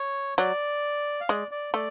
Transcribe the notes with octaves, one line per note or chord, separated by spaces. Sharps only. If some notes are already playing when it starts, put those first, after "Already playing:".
Already playing: C#5
F#3 D5
F5
G#3 D5
D5
A3 D5